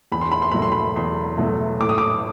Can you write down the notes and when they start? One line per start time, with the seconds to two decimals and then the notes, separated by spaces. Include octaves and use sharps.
0.12 E2 B5
0.21 C6
0.32 B5
0.42 C6
0.52 B2 F#3 A3 B5
0.62 C6
0.72 B5
0.96 E2 C6
1.38 B2 F#3 A3
1.80 A2 D6
1.89 D#6
1.98 D6